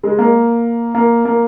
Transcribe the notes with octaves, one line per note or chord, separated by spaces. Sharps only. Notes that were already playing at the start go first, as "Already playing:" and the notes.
G#3
A#3
A#3
A#3